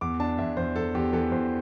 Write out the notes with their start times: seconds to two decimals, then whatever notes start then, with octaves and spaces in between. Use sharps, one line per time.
0.01 E2 D6
0.20 D4 A5
0.38 E2 E5
0.57 E2 C5
0.76 E2 A4
0.95 E2 G4
1.13 E3 A4
1.32 E2 C5